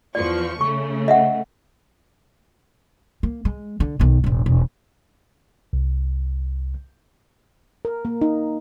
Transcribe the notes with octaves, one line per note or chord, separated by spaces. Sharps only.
E2 F3 D5 C#6
C#3 A3 C#6
D#5 E5 F#5
A#3
G#3
D3
B1 D#3
E1 A1
E1
C2
A#4
A#3
D#4